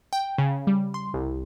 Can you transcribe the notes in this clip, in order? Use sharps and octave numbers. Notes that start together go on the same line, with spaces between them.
G5
C#3
G3
C6
C2